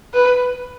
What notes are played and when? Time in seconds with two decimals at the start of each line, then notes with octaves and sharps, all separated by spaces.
0.14 B4